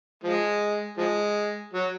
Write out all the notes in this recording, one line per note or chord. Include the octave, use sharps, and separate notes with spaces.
F3 G#3
F3 G#3
F#3